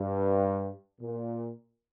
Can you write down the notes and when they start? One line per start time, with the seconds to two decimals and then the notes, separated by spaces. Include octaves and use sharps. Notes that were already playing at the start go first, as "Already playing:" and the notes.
Already playing: G2
1.01 A#2